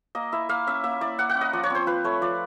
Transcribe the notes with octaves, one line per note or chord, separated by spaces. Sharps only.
A#3 D#5
E4 E5
A#3 F5
C#4 E5
A#3 E5
E4 D5
A#3 F#5
F#5
C#4
D#5
F3 D5
C#5
C4 C5
F4 B4
A3 C#5
F3 D5